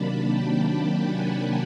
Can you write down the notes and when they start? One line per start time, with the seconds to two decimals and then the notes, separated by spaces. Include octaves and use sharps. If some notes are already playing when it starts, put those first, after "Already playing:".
Already playing: C3 D#3 F#3 A#3 D4 A5 B5
0.24 G5 A5
0.65 G5 A5
1.06 F#5 G#5